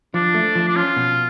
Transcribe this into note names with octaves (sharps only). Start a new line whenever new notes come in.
F3 D4
A3
F3
D4
C#4 F4
B2